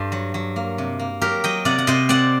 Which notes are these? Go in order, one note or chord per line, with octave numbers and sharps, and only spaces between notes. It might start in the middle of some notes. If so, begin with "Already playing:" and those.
Already playing: G2 A4 C5
F#3
F#3
A#3
C3
A#3
F#3 G4 A#4
F#3 D#5 G5
C3 D5 F#5
F#5
C3 C5 D#5
C4 D5 F#5